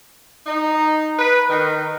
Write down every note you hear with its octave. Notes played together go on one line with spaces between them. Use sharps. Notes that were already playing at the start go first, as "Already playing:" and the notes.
D#4
B4
D#3